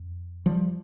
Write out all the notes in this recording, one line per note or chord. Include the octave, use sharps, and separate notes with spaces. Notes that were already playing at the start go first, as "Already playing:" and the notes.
Already playing: F2
F3 G3